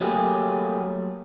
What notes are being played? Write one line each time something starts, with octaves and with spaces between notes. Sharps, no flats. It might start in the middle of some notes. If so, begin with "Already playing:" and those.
F#3 G3 A3 A#3 G4 G#4